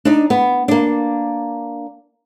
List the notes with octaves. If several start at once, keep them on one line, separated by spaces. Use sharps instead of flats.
D4 D#4
B3
A#3 D4